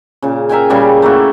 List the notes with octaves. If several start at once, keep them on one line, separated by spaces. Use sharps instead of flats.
A#2 C#3
A#4 E5 G5 G#5
A#2 C#3 G3 G4
A3 A#3 E4 F#4